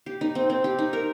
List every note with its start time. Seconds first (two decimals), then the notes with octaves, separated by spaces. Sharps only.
0.06 G4
0.21 D#4
0.35 C4
0.50 C4
0.64 G4
0.79 D#4
0.93 A#4